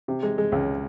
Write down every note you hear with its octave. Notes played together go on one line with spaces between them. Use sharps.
C3
G#3
G#3
C#2